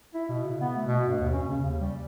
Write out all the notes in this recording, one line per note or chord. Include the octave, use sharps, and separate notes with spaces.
E4
B2
C#3
B3
A3
B2
G2
D#2
C#4
C#3
D#2
G3